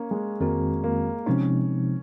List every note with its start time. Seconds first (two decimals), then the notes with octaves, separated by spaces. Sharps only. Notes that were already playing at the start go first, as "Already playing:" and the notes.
Already playing: A#3 C#4
0.11 G#3
0.40 F2 D#3 G#3 A#3 C4 F#4
0.84 A#3
1.26 C3 F3 G#3 C4 C#4 D#4